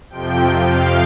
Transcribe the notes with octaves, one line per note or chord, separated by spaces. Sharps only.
F2 C3 F3 G5
F5